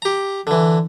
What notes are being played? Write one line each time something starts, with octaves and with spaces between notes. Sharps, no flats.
G4 A#5
D3 E3